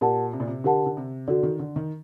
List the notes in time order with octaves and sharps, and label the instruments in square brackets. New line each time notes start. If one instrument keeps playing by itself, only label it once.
[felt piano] A#2 [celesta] G4 A#4 F#5 A5
[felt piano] C3
A#2
C3
[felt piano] D3 [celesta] G4 A#4 F#5 A5
[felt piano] D3
C3
[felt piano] D3 [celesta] F#4 A4 D5
[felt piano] D#3
D3
D#3